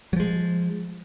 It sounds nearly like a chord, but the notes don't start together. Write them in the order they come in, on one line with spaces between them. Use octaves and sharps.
F#3 F3 G#3